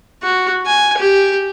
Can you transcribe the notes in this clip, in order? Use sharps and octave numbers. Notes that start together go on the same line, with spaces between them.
F#4
G#5
G4